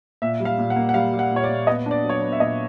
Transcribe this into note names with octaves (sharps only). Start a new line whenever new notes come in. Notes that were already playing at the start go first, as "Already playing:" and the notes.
A#2 E5
G3
F5
A#2
F#5
A#3
F#5
G3 F5
G3
F#5
A#2 C#5
D5
A#2
B3 D#5
D4 D5
F#3
C#5
D5
B3
E5
A#2 D#5